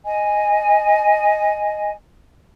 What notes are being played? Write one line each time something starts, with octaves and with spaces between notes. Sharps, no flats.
D#5 G#5